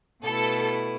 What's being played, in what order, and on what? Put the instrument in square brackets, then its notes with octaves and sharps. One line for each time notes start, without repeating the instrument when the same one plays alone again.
[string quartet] B2 A3 E4 B4 [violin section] A4